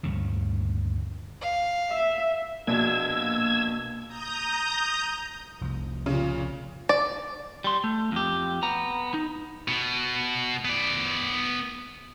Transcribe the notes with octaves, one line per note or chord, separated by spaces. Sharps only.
D2 G2 A#2 C#3
F5
E5
A#1 B2 A#3 E6 G#6
A#5 D#6 G6
F1 C2 F3
A#2 C#3
D5
G3 C6
A3
F2 G4
B3 A#5
D#4
B2
B3 D5